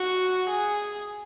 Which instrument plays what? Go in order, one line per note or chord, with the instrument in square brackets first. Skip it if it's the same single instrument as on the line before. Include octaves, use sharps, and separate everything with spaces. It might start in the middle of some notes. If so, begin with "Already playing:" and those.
Already playing: [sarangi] F#4
G#4